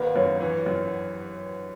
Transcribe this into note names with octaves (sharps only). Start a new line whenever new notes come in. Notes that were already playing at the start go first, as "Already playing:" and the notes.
Already playing: G#1 A#3 B4
F#2 C#5
E3
F#2